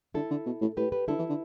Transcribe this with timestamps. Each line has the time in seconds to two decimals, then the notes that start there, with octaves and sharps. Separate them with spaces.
0.14 D3 E4 A4
0.30 D3
0.46 B2
0.61 A2
0.77 A2 G4 B4
0.92 G4 B4
1.08 D3 E4 A4
1.18 E3
1.29 D3